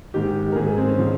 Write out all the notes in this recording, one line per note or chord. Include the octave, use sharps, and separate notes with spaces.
G#2 D#3 G4
A#4
G#2 D#3 G#4
G#4
C4
C#4
C#3 F3